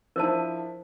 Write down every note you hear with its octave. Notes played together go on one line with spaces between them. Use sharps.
F3 D4 E4 A#4 C5 A5